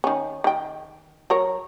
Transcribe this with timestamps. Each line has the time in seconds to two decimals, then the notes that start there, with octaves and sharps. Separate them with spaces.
0.04 D#3 C#4
0.44 D#3 G5
1.30 F#3 A#4 C#5